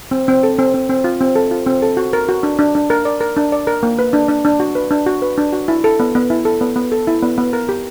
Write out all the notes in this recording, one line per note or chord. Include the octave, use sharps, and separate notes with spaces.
C4
C4
A4
C4
C4
C4
F4
C4
A4
F4
C4
A4
F#4
A#4
F#4
D4
D4
D4
A#4
D5
A#4
D4
D5
A#4
A#3
B4
D4
D4
D4
F#4
B4
D4
F#4
B4
D4
F#4
E4
A4
B3
B3
E4
A4
B3
B3
A4
E4
B3
B3
A#4
G4